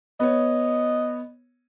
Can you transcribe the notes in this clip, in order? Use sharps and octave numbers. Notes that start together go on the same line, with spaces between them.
B3 C#5 D#5